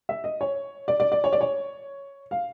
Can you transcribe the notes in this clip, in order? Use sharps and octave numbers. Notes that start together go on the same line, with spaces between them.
E5
D#5
C#5
D5
D5
D5
C#5
D5
C#5
F5